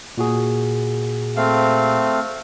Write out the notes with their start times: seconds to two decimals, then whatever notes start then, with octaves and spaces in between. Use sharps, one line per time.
0.18 A#2 F#4 G#4
1.36 A3 C4 F5